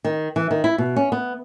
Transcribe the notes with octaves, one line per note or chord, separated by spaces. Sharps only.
D#3
E3
D#3
E4
B2
C#4
B3